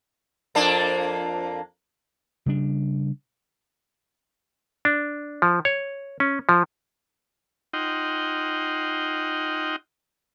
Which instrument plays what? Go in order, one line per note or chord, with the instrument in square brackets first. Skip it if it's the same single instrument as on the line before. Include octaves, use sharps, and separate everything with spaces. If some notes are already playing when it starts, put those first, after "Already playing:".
[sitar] F2 A#3 D4
[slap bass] C#3 G3 D4
[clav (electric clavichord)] D4
F3
C#5
C#4
F3
[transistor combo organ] D#4 F4 D#5 F#5 G5 C6